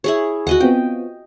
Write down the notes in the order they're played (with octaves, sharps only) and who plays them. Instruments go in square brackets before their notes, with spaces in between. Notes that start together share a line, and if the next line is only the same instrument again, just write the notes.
[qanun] E4 G#4 C#5
[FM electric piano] D#2 [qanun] F#4 D#5 F#5
[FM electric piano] B3 C4 F4 [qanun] G5